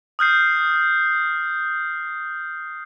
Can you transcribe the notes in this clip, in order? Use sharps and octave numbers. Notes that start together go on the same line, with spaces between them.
D#6 F6 G6 C7